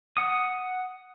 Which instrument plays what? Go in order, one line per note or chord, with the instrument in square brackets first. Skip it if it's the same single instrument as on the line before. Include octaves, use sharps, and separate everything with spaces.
[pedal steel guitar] F#5 D#6